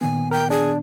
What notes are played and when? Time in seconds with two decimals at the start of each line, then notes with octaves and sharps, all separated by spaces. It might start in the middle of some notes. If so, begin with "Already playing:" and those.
0.01 A#2 D#3 B3 G#5
0.31 A#4 G5
0.50 D4 G#4